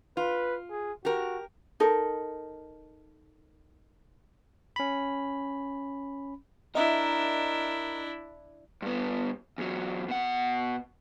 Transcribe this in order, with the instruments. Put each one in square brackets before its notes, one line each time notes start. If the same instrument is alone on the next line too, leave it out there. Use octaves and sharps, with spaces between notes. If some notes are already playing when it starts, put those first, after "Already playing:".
[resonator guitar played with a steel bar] F4 [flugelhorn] B4
[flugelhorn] G#4
[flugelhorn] F#4 [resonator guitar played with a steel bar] G4 A#4
[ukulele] D#4 A4 A#4
[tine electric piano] C#4 B5
[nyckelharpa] D4 E4 [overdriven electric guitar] A#4 [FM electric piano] D#5 E5
[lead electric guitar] G2 B3
E2 F#3
B2 F#5